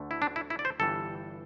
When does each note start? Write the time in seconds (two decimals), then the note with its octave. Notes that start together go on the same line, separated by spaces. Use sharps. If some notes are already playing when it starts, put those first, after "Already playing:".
Already playing: D2 D3 A3
0.11 E4
0.22 D4
0.36 E4
0.50 E4
0.59 D5
0.65 C5
0.80 G1 G2 E3 G3 A4